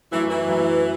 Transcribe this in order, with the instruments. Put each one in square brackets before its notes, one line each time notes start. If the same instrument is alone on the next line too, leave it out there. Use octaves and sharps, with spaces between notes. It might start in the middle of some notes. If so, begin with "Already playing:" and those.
[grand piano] F#2 F#3 A3 [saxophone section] E3
[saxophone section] E3
[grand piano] F#2 F#3 A3